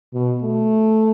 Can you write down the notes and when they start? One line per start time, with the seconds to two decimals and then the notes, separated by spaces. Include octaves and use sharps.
0.13 B2
0.42 A3